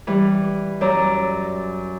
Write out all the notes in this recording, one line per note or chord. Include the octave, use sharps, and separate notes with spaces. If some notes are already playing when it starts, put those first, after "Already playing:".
E3 G3
F#2 D5 A#5 E6